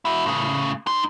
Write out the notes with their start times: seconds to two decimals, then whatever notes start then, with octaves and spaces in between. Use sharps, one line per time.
0.05 E4 F#4
0.26 A2 C#3
0.87 D#4 C6